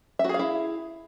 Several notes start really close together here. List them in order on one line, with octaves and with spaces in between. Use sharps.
E5 F#4 G#4 F5 E4